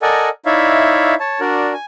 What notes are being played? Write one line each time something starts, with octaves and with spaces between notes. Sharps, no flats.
A4 A#4 D5 D#5 F#5 G#5
D#4 E4 C#5 D5 E5 F5
C#5 A5
D4 F#4 A#4 D5
G#5